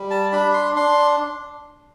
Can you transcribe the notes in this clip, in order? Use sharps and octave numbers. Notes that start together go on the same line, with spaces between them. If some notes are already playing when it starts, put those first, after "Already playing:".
Already playing: G3
A5
D4 B5
C6
D4 C6